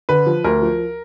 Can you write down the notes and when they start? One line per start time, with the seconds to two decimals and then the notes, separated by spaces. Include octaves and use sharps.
0.09 D3 B4
0.26 F3
0.44 D2 A#4
0.62 F3